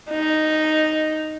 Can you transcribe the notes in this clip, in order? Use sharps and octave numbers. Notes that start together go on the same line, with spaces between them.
D#4